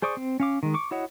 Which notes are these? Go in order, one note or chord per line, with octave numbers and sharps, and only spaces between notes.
G#4 C5 D5 C#6 D#6
C4
C#4 F5 D6
D#3 G#3
C#6 D6
E4 F#4 C#5 D#5 F#5